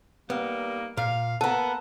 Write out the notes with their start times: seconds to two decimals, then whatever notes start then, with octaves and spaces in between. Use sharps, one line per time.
0.30 G3 A#3 B3 D#4
0.97 A#2 F5
1.41 A#3 B3 A4 F#5 A5 A#5